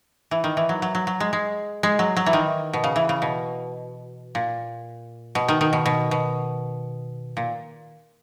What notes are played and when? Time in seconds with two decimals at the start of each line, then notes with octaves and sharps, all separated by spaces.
0.31 E3
0.44 D#3
0.57 E3
0.69 F#3
0.82 F#3
0.95 F#3
1.07 F#3
1.20 G#3
1.33 G#3
1.83 G#3
1.99 F#3
2.17 F#3
2.26 E3
2.33 D#3
2.73 B2
2.84 C#3
2.96 E3
3.09 C#3
3.22 B2
4.35 A#2
5.35 B2
5.48 D#3
5.61 D#3
5.73 B2
5.86 B2
6.11 B2
7.37 A#2